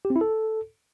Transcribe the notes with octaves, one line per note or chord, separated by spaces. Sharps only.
G4
C4
E4
A4